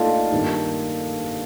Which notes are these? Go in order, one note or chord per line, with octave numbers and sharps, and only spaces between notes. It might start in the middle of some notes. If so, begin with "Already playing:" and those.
Already playing: A#2 A3 D#4 F4 A4 D5 F5 A5
G2 D#3 A#3